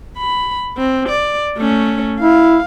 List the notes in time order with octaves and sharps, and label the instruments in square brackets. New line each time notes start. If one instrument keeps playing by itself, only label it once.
[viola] B5
C4
D5
A3 C#4
[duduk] E4 [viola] F5